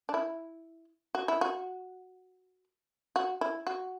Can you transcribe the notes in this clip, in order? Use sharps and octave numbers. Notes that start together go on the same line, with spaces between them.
D4
E4
F#4
E4
F#4
F#4
E4
F#4